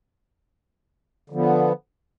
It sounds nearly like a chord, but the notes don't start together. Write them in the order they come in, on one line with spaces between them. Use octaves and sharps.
D3 F3 B3